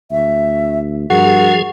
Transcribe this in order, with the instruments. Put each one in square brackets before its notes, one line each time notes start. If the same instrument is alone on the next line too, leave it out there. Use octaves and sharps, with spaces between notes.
[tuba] D2 [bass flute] E5
[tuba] G2 [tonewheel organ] F3 G#4 [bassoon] F#4 [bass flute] A#4